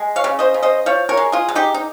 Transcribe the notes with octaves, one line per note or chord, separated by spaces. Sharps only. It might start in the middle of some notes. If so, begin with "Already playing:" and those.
Already playing: G#3
C#5 F5
C#3
C5 D#5
C#3
C5 D#5
F3 C#5 F5
A#4 C#5
G#3
F4 G#4
G#3
D#4 G4
D#4